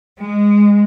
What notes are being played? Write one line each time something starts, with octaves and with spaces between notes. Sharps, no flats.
G#3